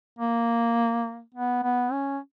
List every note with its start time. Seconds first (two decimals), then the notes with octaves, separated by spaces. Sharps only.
0.19 A#3
1.34 B3
1.63 B3
1.92 C#4